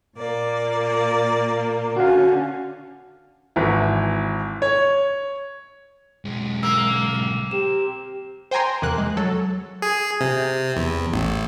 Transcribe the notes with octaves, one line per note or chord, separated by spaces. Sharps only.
A#2 A#3 D5
D3 C#4 F#4 F5
G#1 E3
C#5
B1 G#3
A#3 E6
C4 G4 E7
C5 G5 G#5 A#5 C6
E2 C3 A#3 F#6
G#3
F#3 A4
G#4
C3
E2
A1